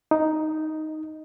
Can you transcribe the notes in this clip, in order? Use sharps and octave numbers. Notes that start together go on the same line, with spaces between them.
D#4